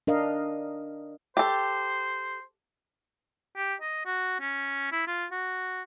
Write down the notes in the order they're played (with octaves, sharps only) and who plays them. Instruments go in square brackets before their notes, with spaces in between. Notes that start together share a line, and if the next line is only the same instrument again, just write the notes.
[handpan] D4 A#4 D#5 F5
[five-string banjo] G4 A4 [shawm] C5
[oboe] G4
D#5
F#4
C#4
E4
F4
F#4